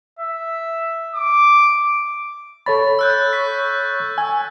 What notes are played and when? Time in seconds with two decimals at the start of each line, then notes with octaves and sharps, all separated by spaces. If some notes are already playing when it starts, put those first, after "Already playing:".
0.19 E5
1.15 D6
2.66 A4 C#5 B5 A6
2.99 E6 F#6 G6
3.33 C#6 B6
4.18 G#5 E6